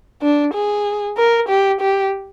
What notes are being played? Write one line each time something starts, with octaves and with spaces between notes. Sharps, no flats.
D4
G#4
A#4
G4
G4